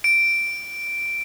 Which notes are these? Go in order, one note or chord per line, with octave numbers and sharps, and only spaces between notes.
D7